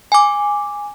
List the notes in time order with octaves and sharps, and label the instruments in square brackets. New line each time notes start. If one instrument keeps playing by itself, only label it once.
[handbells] G#5 D6